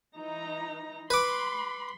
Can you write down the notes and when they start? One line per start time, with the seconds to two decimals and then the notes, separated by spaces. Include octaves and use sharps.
0.15 E3 D#4 A#5
1.10 B4 B5 C6 D6